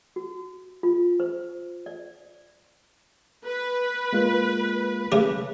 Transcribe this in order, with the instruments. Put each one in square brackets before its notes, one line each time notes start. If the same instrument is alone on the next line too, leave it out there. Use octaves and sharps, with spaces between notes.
[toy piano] F#4
F4
C5
D5
[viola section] B4
[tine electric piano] G#3 A#3 F4
[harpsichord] C#3 A3 G4